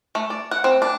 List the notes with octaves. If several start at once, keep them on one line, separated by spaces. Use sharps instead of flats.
A3
D5
F#5
C4
D4